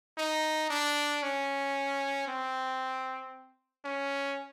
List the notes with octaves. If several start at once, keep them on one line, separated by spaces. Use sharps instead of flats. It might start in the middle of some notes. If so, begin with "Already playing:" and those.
D#4
D4
C#4
C4
C#4